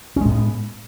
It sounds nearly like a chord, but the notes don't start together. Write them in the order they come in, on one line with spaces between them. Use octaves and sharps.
C#4 G#3 A2 B3